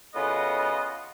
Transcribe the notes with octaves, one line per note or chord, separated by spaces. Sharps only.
A2 C#3 B3 F4 F#4 D#5